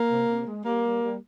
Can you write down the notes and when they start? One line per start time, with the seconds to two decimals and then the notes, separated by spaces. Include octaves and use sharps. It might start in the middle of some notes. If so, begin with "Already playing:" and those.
Already playing: A#3
0.09 C3
0.27 C3
0.46 G#3
0.65 G3 A#3
0.84 G3
1.02 G3